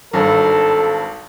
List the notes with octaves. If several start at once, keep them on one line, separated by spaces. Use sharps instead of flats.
G#1 G2 A4